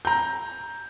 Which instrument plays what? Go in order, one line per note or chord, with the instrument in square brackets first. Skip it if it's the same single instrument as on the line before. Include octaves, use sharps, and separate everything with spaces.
[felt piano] A#5 G6